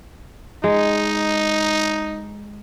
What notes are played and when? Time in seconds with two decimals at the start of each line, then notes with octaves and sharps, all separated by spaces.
0.64 G#3 D#4